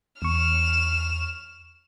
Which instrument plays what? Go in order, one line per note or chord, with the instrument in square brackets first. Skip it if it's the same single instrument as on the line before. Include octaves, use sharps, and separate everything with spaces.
[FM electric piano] E2 C#6 [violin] F6 E7